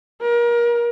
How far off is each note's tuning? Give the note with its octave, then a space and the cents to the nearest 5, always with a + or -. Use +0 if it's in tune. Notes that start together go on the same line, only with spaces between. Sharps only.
A#4 +30